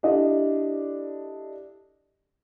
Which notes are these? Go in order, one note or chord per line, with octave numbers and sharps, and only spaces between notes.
D4 E4 G4 A4 D5 D#5